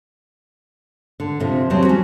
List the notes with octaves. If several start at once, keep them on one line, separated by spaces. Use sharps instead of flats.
D3
F2 C3 F3
E2 F#3 G3 C4 A5
C#4 F#4